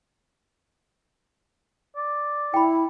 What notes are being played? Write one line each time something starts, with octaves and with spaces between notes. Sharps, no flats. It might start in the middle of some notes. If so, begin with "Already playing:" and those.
D5
E4 G5 B5